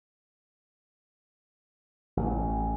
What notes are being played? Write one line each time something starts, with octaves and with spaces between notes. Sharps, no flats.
A1